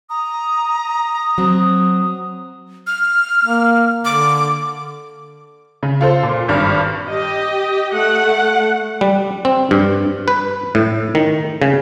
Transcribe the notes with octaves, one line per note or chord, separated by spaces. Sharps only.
A#5 D#6
F#3 C4
F6
A#3
D3 D6
C#3
F4 A4 C5
A#2
G#1 G2 F6
G4 D#5
A3 F#5
G3
C4
G2
B4
A2
D#3
C#3